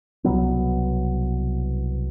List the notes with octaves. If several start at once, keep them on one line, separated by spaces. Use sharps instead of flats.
C2 B2 F#3 B3